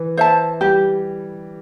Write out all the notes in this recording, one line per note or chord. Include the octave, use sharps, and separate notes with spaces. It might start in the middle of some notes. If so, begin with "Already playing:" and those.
Already playing: E3
C5 E5 A5
G3 G4